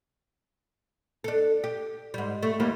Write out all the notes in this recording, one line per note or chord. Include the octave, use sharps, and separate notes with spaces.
D4 A4
G4
G#2 G3
A3
D#2 G3 A#3